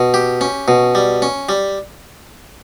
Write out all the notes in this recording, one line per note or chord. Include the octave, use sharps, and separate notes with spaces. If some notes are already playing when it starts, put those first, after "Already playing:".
Already playing: B2
G4
C#4
B2
G3
C#4
G3